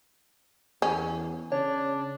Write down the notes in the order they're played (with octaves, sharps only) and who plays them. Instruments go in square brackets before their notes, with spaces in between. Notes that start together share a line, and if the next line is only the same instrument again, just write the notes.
[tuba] E2 [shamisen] C#4
[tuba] C#3 [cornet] D4 [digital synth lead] C#5